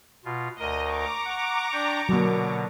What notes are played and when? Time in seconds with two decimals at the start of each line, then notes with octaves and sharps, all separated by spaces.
0.25 B2 F4
0.59 D2 A#4 D#5
0.92 A#5 C#6 D6
1.25 F#5
1.73 D4 D5 G5
2.09 B2 D3 F#3 A#3